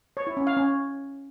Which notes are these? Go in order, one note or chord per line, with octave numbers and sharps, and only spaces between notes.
C#5
E4
C#4
F5
C#4